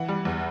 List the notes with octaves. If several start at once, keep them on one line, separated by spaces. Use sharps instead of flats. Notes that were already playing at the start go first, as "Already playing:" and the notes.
Already playing: E3 F#5
G3
E2